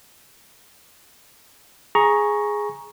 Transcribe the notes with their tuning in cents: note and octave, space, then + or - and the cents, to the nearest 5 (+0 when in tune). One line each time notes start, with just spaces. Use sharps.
G#4 +0 A#5 +10 C#6 +0